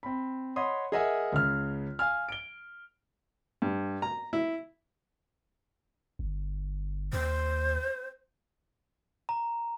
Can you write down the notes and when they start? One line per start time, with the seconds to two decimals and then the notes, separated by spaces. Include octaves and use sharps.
0.03 C4 B5
0.56 C#5 D#5 F#5 B5 C6 D#6
0.92 G#4 A#4 D#5 E5 F#5 G#5
1.32 C#2 C#3 F6
1.99 F5 G#5 F6
2.29 D7 G7
3.62 G2
4.02 A#5
4.33 E4
6.19 G1
7.13 D#2 C5
9.29 A#5